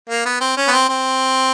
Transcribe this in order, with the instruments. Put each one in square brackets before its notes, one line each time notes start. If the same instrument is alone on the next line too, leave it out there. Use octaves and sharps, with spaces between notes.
[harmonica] A#3
B3
C4
C#4
B3
C4
C4